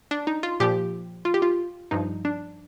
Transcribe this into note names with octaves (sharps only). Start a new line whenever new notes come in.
D4
D#4
F4
A#2 F3 G4
F4
G4
F4
G2 F3 D#4
D4